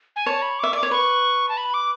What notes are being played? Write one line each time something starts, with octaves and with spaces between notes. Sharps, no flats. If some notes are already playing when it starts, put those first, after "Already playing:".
G#5
C#5 A5
B5
E5 D6
D5 D6
C#5
B4 C#6
A5
B5
D6